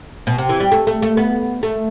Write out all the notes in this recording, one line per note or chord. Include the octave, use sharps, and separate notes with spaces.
B2
C3
E3
G3
A3
A3
A3
B3
A3